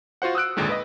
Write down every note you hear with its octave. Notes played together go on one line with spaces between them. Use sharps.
F4 F#4 C5 F#5
D#6 E6 F#6 D7
G#1 D#2 A#2 D3 G#3
B4 D#5